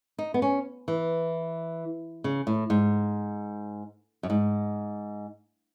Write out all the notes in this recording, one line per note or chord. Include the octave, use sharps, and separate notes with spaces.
D#4
B3
C#4
E3
C#3
A2
G#2
F#2
G#2